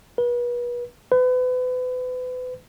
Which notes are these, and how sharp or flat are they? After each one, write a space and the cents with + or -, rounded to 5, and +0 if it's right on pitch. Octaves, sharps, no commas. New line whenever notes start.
B4 -35
B4 +35